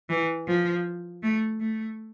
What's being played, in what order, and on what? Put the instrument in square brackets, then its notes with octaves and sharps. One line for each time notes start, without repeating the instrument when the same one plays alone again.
[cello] E3
F3
A3
A3